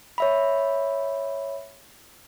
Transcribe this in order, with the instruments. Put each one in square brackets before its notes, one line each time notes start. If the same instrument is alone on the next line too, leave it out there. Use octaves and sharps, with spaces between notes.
[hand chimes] C#5 E5 B5